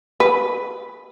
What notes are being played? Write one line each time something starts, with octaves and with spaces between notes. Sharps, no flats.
B4